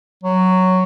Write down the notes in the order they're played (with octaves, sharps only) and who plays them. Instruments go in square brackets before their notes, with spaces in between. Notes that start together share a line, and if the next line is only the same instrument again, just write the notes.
[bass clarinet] F#3